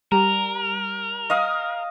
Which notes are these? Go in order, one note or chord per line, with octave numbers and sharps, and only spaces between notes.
G3 A#4 A#5
D#5 F5 D#6